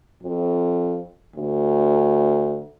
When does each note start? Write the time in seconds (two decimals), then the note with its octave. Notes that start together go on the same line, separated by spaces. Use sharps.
0.23 F2
1.35 D2